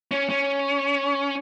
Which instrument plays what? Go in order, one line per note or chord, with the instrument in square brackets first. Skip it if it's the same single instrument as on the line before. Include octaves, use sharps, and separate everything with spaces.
[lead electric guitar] C#4
C#4